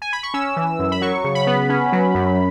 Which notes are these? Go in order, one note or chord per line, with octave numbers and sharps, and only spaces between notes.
G#5
B5
C#6
C#4 E6
E3
F#2
B5
F#3 C#6
C#3
B5
B3
C#4
F#3
F#2